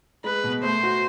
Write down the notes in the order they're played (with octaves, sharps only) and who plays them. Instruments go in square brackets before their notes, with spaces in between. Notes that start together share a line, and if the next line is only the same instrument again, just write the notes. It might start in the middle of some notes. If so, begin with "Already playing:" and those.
[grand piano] G#3 [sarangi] B4
[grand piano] B2
[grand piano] A3 [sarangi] C5
[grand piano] F#4